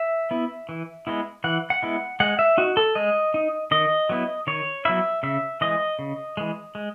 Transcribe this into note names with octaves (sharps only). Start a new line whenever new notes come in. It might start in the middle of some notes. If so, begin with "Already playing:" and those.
Already playing: E5
B3 E4
E3
G#3 B3 E4
E3 F#5
F#5
G#3 B3 E4
G#3 F#5
E5
D#4 F#4
A4
G#3 D#5
D#4
D#3 D#5
F#3 B3 E4
D#3 C#5
F#3 B3 E4 E5
C#3 E5
E3 G#3 D#5
C#3
E3 G#3
G#3